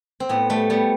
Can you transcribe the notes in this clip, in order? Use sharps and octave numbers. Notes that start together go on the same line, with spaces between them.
C4
A2 B3
G3 A3
G3 B3